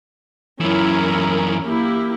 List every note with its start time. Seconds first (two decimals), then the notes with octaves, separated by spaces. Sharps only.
0.61 F#2 E3 C#4 E4 A#4
1.65 A#3 E4 G4